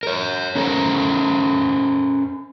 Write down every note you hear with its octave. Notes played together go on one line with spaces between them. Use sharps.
A#4 C#5
C#4 A4 A#4 C5